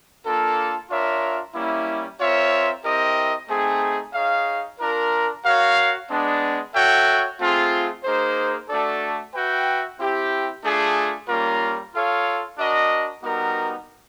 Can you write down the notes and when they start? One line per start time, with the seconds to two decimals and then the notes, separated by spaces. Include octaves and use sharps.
0.25 A#3 D4 F4 A4
0.90 D4 F4 A#4 C#5 E5
1.54 G3 A#3 C#4 E4
2.19 C4 F4 A#4 C#5 E5
2.84 C4 E4 G4 A#4 D#5
3.49 A3 C4 D#4 G#4
4.14 D#4 G#4 C#5 F5
4.80 D4 F4 A#4
5.45 F#4 A#4 C#5 F5
6.09 G#3 B3 D4
6.74 F#4 A4 C#5 E5 G5
7.39 A3 C4 F4 G#4
8.04 A#3 D#4 G#4 C5
8.68 A3 D4 F#4 A4 D5
9.34 F#4 B4 E5 G5
9.99 C4 E4 G4
10.63 A3 D4 F4 G#4
11.29 G3 A#3 C#4 F4 A#4
11.94 F4 A4 C#5 F5
12.58 D4 F#4 A#4 D#5
13.23 G3 B3 D#4 F#4 A#4